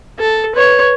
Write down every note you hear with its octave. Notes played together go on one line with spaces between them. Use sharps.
A4
B4 C#5